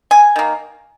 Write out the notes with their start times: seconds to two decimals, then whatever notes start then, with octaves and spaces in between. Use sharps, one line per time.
0.11 G#5
0.36 D#3 A#3